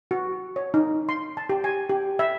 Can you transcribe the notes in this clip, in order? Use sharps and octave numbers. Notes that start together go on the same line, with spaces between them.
F#4
C#5
D#4
C6
A5
G4
G#5
G4
E5